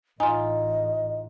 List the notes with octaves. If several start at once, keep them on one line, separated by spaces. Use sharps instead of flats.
A1 A2 D#4 F4 D#5 G#5